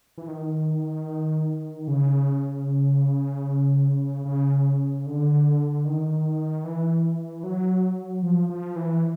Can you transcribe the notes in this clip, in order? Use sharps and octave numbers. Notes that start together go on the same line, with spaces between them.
E3
D#3
C#3
C#3
D3
D#3
E3
F#3
F3
F3
E3